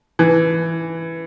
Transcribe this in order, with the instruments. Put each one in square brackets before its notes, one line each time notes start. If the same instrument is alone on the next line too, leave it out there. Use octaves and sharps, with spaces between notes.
[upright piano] E3